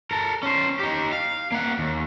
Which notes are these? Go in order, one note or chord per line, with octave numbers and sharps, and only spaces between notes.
A4 A#4
C#4 C5
D#4 G4
F5
A#3 F#5
D#2